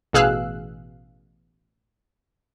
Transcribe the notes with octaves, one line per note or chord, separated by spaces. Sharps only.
A1 B2 G#4 F5 E6 F#6